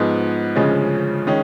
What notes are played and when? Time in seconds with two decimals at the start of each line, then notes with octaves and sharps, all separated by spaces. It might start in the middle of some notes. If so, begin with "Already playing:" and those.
Already playing: G#2 F3 G#3 B3
0.56 D2 C#3 F3 G#3 C#4
1.27 D#3 G#3 C#4